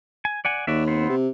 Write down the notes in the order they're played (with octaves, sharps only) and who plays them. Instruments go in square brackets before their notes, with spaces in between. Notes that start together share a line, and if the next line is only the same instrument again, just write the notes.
[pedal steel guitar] G#5
D5 F#5 G#5
[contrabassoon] D#2 [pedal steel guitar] F#4 D5 E5
[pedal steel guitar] B3 C4 C5
[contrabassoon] C3